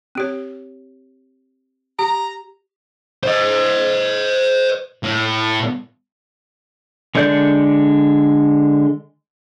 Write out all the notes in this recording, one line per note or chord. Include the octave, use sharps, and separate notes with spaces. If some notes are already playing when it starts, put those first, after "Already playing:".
C4 G4 C#5
G4 A#5
C5 D#5
A2
D3 G#3 A4 D5 G6